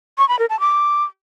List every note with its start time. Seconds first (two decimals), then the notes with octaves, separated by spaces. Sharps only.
0.18 C#6
0.29 B5
0.39 A#4
0.50 A5
0.60 D6